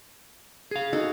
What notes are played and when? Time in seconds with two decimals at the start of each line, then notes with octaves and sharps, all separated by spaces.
0.71 G#4 F5
0.93 D#4 F#4 A4